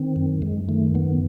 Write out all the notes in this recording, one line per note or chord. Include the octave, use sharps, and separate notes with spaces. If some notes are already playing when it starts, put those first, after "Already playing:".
Already playing: D#3 C4
F#2
F#2 G#3
D#3 A3
F#2 B3